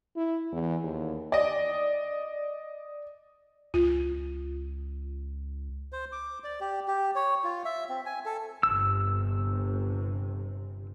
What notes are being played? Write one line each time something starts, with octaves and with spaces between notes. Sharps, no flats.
E4
E2
D#2
D5 D#5
C#2 F4
C5
D6
D5
G4
G4
C#5
F4
E5
C4
G#5
A4
G1 C3 E6